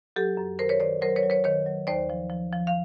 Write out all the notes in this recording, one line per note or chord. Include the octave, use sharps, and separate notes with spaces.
F#3 G4 A4
F#2
D#3 A#4 C5
B4 C#5
D#3 C5 D5
F#3 A#4 C5
B4 C#5
F#3
B4 C#5
D#3 B4 C#5
F#3
D#2 C5 D5
F3
F3
F3
F5